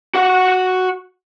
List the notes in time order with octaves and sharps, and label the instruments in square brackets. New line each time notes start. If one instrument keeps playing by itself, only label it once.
[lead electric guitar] F#4 F#5